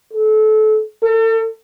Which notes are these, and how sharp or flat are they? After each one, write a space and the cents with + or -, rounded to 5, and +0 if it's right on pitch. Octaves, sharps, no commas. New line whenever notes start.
A4 -30
A4 +40